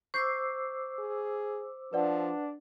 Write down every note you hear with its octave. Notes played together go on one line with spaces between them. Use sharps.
C5 C#6 D6 E6 G6 C7
G#4
F3 D4 B4 D5 F#5